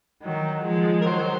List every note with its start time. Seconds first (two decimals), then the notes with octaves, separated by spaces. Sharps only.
0.23 D#3 F#3
0.64 F3 G#3
1.01 A#4
1.06 D#3 F#3 C5